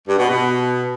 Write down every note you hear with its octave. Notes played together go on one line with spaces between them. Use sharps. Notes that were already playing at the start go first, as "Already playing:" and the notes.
G2
B2
B2